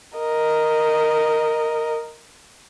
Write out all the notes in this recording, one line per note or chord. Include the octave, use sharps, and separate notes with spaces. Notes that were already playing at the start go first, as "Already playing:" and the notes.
A#4 D#5